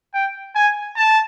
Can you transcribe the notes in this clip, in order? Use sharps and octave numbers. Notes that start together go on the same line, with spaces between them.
G5
G#5
A5